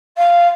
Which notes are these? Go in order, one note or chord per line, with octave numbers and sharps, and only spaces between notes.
F5